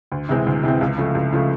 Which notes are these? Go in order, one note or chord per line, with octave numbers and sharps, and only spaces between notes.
D2
C3 E3 G#3 C4
D2
C3 E3 G#3 C4
C#2
C#3 F3 A3
C#2
C#3 F3 A3